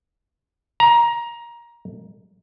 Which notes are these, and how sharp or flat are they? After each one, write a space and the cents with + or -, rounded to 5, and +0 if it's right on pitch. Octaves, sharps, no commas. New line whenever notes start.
A#5 +20